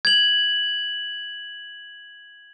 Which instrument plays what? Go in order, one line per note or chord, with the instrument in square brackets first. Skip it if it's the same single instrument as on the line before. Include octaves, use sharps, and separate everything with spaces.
[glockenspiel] G#6 F#7